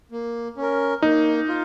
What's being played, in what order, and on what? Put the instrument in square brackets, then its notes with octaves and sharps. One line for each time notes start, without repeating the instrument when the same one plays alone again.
[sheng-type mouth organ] A#3
C#4 A#4
[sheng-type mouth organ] A#3 [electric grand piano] D#4
[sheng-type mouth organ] F4